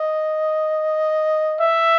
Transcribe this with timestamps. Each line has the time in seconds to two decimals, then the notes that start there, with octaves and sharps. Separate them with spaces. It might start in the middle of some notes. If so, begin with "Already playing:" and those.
Already playing: D#5
1.59 E5